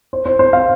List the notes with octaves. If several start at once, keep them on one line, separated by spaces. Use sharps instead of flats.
C5
C5
C5
F5